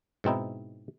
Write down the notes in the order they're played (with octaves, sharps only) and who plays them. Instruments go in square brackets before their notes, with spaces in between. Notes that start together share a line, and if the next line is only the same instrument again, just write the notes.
[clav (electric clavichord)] G#2 B2 C4 D#4 E4